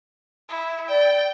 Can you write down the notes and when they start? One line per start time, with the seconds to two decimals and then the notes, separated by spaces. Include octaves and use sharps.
0.49 E4
0.89 D5 G5